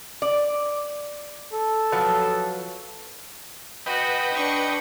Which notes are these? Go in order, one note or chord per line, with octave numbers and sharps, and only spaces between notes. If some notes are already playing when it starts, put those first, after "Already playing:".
D5
A4
F3 F#3 B4
F#4 B4 D#5 G5
D4 C#6